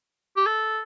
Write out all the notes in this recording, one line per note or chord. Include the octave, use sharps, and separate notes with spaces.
G4
A4